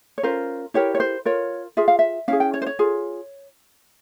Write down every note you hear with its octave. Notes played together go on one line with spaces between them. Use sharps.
C#5
C#4 F4 A#4 C5
E4 G4 A#4 C#5
C#5
C5
F4 A#4 C#5
F4 G#4 E5
F5
E5
C#4 E4 G#4 F5
G5
C#5
C5
C#5
F4 G#4